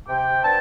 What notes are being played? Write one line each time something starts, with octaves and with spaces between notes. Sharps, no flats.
C3 G5
B3 D4 A5